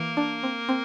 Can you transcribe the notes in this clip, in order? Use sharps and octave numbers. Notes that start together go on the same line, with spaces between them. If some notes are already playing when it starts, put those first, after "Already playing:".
Already playing: E3 A#3 A#4
D4
C4
C4